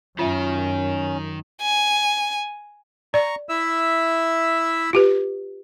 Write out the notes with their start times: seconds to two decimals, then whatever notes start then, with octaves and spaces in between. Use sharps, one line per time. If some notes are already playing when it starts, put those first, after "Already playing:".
0.19 F#2 D#3 C#4 F4 C#5 E5
1.62 G#5
3.14 D5 A#5 C#6
3.49 E4 E5 E6
4.93 F4 G4 B4